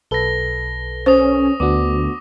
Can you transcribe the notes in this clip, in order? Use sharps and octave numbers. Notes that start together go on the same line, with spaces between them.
B1 A4 B4 A#6 G7
C#4 C5 C#6 D#6
D2 B3 D4 F#4 D6